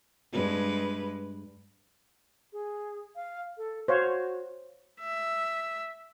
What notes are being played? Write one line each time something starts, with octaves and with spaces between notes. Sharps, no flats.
G2 G#3 B4
G#4
F5
A4
F#4 C5 C#5 F5
E5